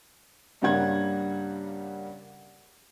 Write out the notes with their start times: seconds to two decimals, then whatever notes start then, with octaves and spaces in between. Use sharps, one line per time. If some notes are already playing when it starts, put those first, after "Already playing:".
0.62 G2 C#3 G3 A#3 F#5 G#6